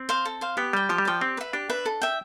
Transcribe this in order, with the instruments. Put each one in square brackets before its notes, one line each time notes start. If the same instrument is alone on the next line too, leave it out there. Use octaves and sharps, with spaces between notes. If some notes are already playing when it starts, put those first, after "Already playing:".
Already playing: [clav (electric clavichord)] C4
[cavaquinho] C5 F5
A4
C5 F5
[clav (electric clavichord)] B3 [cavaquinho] G4
[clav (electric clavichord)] G3 [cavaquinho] D5 G5
[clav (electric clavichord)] F3 [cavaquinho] G4
[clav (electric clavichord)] G3
[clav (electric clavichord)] F3 [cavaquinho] D5 G5
[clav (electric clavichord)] C4 [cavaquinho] G4
[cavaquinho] B4 E5
[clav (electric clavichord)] D4 [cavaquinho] G4
[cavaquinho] B4 E5
A4
E5 G5